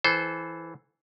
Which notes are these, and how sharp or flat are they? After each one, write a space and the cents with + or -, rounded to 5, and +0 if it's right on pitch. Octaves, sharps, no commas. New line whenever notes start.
E3 +0 A4 -25 C5 +0